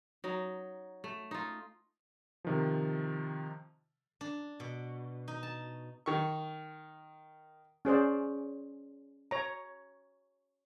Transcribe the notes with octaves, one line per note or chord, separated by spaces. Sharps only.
F#3 D#4
A3
D#4 F4
C3 D#3 F3
D4
B2
D#4
A5
D#3 C#6
C#4 G#4 C5 D5
C#5 A#5